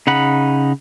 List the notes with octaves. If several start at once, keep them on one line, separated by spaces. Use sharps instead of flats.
C#3 D#4 F#5 B5